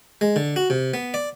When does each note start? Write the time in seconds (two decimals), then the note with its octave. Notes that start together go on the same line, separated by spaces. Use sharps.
0.21 G#3
0.36 D3
0.56 F#4
0.70 C3
0.94 B3
1.14 D5